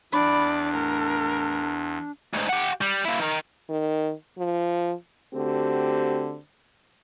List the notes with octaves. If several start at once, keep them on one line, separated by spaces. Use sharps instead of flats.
E2 D4 D5 B5
A2 A#4
D2 G#2
G4 F#5
G3
A#3 E4
D#3 A#4
D#3
F3
D3 A3 C4 F#4 G4